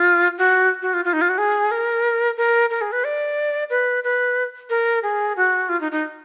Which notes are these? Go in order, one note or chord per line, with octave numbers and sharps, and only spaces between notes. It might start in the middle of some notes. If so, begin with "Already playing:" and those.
Already playing: F4
F#4
F#4
F4
F4
D#4
F4
F#4
G#4
A#4
A#4
A#4
G#4
B4
D5
B4
B4
A#4
G#4
F#4
F4
D#4
D#4